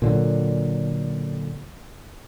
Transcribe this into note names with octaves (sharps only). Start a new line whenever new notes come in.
A#2 D3 F#3